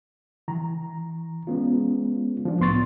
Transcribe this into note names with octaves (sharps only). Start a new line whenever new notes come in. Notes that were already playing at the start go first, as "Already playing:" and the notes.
E3 A#5
G#3 B3 C#4 F4
F3 D4
C2 A2 B3 C6 C#6 A6